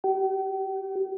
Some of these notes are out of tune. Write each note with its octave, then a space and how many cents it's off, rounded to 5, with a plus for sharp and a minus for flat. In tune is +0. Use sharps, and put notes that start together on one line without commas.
G4 -40